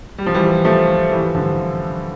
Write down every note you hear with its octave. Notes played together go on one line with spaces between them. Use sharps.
G3
F3
E3 G3
F3 A3
E3 G3
D3 F3